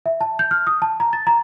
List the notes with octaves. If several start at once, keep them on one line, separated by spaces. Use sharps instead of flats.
E5
A5
G6
F6
D#6
A5
A#5
A6
A#5